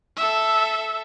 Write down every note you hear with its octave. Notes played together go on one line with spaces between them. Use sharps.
A4 E5